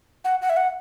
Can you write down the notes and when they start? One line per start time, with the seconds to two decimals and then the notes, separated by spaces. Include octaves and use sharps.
0.24 F#5
0.42 F#5
0.50 E5
0.57 F#5